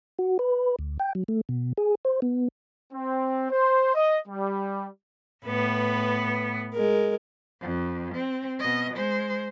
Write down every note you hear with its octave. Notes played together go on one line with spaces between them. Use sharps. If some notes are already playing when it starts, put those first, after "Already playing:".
F#4
B4
D2
G5
F#3
A3
B2
G#4
C5
B3
C4
C5
D#5
G3
A2 B3 B4
G#3 A#4
F2
C4
B2 D#5
G#3 C5